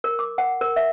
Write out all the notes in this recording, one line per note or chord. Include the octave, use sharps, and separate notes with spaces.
A#4
D6
F#5
A#4
E5